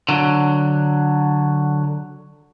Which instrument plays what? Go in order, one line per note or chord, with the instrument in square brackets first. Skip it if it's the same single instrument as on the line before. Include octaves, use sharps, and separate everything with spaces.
[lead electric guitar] D3 F#3